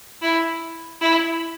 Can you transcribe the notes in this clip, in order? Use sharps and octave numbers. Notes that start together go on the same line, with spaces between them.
E4
E4